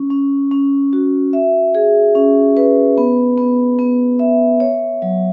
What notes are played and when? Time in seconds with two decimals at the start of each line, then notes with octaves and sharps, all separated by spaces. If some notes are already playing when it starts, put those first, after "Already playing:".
Already playing: C#4
0.10 C#4
0.51 C#4
0.93 F#4
1.33 E5
1.75 G#4
2.15 C#4
2.57 B4
2.98 B3
3.38 B3
3.79 B3
4.19 E5
4.60 C#5
5.02 F#3